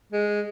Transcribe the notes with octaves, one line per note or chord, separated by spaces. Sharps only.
G#3